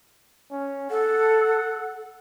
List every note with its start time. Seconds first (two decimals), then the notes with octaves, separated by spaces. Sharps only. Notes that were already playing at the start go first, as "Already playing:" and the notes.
0.51 C#4
0.90 A4 F#5